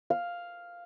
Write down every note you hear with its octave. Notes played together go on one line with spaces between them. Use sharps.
F5